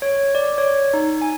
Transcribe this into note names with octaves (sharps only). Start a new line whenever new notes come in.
C#5
D5
C#5
D#4
G#5